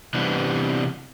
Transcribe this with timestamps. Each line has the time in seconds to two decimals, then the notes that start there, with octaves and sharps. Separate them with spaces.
0.14 C3 E3 G3 B3 C4 D4